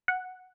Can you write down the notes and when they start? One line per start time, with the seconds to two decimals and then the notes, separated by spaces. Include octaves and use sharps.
0.08 F#5